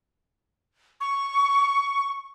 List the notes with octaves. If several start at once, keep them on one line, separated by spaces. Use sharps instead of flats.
C#6